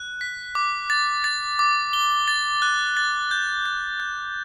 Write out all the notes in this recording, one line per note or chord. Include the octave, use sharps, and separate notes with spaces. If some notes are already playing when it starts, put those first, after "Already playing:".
Already playing: F#6
B6
D6
A6
A6
D6
G7
A6
F#6
A6
G6
G6
G6